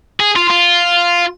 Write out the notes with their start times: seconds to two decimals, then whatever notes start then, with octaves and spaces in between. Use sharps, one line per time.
0.20 G#4
0.36 F4
0.50 F4